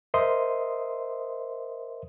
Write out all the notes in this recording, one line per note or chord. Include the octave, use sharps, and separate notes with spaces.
A#4 C5 D#5 E5 C6 D#6